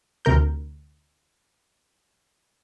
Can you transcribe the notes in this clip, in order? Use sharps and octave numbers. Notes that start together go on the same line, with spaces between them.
D2 C3 A#4 G6